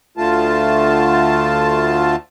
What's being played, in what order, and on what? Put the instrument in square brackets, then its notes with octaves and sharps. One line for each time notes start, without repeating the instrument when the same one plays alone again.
[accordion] D2 D3 A3 F4 A5